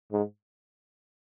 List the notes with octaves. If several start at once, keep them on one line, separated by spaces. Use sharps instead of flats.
G#2